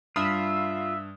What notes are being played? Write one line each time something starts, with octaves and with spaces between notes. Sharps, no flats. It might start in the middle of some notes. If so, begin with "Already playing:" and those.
G2 F4 E5 B5 D#6 F6